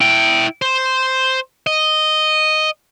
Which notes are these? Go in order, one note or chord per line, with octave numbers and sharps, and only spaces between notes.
E4 G5
C5
D#5